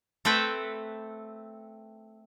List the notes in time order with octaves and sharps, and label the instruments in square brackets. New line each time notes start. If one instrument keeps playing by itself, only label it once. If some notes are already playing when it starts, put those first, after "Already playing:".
[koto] A3 C4 A4 B4 G5